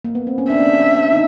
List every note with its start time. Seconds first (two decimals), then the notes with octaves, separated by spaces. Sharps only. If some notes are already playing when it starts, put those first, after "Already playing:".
0.04 A#3
0.15 B3
0.27 C4
0.38 C#4
0.50 D4 E5
1.12 D#4